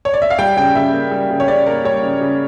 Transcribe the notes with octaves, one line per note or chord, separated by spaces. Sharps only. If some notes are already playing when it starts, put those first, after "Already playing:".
C#5
D5
E5
F5
G3 G5
C#3 G5
C#3 E5
A#3
G3
C#3
C#5
C#3 D5
A#3 A#4
G3 C#5
C#3
C#3